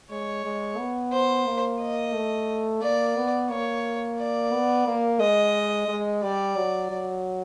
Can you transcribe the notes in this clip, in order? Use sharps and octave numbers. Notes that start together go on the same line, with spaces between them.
G#3 C#5
G#3
B3
C5
A#3
D#5
A3
A#3 D5
B3
A#3 C#5
D5
B3
A#3
G#3 D#5
G#3
G3 D5
F#3
F#3